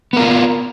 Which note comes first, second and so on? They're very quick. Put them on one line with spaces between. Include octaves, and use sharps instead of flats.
B3 A#4 F4